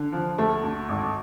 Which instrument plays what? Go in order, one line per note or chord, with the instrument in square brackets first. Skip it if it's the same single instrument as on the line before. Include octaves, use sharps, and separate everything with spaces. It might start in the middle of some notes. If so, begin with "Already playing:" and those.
Already playing: [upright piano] D3
F3
D2 A3
D2
G#1